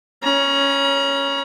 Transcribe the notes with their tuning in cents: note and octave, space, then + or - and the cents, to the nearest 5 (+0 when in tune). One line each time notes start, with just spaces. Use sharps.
C#4 +0 A#5 +40